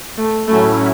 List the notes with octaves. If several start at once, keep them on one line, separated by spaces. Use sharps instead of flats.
A3
A2 F#3 A3 C#4 E4